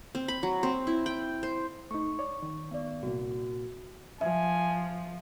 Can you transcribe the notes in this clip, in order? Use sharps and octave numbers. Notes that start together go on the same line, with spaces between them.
C4
B5
F#3
C4
E4
G5
C5
A3 D#4 C#6
C#5 D5
D#3
B3 D5
C2 A#2 A#3 F#4
F3 E5 G#5